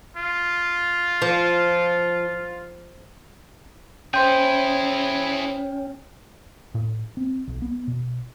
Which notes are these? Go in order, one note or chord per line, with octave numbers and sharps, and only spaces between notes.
F4
F3
C#4 E4 G#4 C5 G5 C6 G6
A2
C4
B1
B3
B2